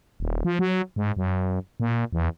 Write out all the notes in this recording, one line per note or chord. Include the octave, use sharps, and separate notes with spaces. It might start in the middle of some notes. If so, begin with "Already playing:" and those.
D#1
F3
F#3
G#2
F#2
A#2
E2